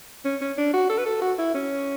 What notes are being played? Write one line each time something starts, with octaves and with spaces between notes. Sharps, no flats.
C#4
C#4
D4
F#4
A4
B4
A4
F#4
E4
C#4